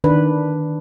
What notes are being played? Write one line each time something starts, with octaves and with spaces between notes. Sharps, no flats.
D#3 D4 B4